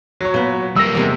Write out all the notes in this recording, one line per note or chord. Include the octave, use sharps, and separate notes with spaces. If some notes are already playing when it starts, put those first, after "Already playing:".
F#3 C#5
A#2 B3
G3 A#3 E6 A#6
E2 C3 G#3